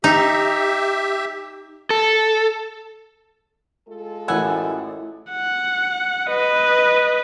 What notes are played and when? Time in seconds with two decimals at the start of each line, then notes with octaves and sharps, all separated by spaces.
0.04 D#4 G4 E5
1.90 A4
3.89 G#3 F4 A4
4.28 A1 F#2 B4 F#5 G#5 E6
5.31 F#5
6.30 B4 D#5